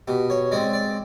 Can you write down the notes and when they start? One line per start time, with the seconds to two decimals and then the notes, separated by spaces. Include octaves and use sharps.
0.08 B2 G4
0.30 C#5
0.52 G#3 C4 D5
0.73 D5